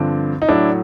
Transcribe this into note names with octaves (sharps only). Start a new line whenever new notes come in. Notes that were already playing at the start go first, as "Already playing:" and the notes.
Already playing: G2 D3 F3 C4 D4
D#4
A2 F#3 D4 E4